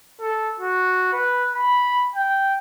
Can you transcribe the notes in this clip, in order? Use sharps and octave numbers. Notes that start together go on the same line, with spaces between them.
A4
F#4
B4
B5
G5